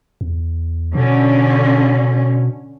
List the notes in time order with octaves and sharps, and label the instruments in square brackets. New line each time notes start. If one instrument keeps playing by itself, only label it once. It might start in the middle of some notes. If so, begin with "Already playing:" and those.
[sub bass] E2
[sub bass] B2 [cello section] D3 C#4